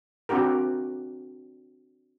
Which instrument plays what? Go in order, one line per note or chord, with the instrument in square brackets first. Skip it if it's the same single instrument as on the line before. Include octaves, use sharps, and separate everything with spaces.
[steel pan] C4 D4 F#4 G4 A#4